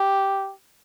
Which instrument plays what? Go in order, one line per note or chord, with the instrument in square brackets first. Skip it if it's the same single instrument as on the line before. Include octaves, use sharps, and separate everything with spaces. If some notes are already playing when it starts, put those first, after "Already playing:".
Already playing: [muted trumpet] G4